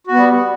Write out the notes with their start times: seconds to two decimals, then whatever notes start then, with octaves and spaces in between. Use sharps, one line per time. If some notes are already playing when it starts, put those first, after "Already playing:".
0.07 F#4
0.12 B3
0.16 G3